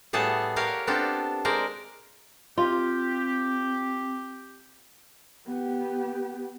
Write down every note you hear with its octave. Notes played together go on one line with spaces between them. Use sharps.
A2 G3 B3 G#4 A4 A5
G4 A#4 C#5 F5 F#5
B3 C4 D4 F4 G4 A4
G#3 A#4 C5 D5
C4 F4 G4
B3 G4